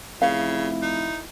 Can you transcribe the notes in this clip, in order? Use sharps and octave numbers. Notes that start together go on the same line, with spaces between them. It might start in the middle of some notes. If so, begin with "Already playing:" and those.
F1 C#3 E4 F5
D#4